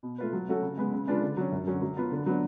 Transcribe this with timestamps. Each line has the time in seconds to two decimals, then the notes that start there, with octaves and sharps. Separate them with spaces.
0.03 B2
0.18 A3 F4 B4
0.33 F#3
0.48 A3 C#4 F#4 A4
0.62 C#3
0.77 G#3 B3
0.93 C#3
1.07 G#3 D4 F4 B4
1.22 D3
1.37 F#3 C#4
1.52 F#2
1.67 D3 F#3 C#4
1.82 F#3
1.97 B3 F4
2.11 D3
2.26 F#3 B3 D4